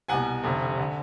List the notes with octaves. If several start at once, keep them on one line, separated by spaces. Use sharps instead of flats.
C2 B2 F#5 G#5
F1 F2 D3
D3